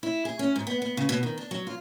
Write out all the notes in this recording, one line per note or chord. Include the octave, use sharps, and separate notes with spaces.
E4
G#4
C#4
G#2
B3
B3
C#3
B2
D#3
D4
F#3
F4